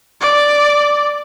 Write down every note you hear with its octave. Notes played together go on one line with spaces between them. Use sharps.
D5